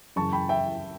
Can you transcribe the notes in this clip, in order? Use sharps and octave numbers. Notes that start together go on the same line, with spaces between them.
F#2 C#3 E3 A5 C#6
G5 B5
E5 G5